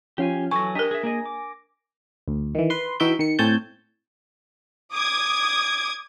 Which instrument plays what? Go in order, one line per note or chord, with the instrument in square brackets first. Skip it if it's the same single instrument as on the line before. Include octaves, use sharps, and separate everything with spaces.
[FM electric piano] F3 C#4 F4 [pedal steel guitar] G4 F5 G#5
[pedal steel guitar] E3 F#3 A4 [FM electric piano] G#5 A#6 [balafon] C#6
[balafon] D4 A#4 [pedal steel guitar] G4 D#5
[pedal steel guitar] G#4 E5
A#3 G#4 D#5
D6
[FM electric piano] D2
D#3 E3
B4 C6
E3 D#4 F#4 E5 G5 G6
D#3 C#7
A2 C4 C#5 G#5 A5 G6
[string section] D6 D#6 G#6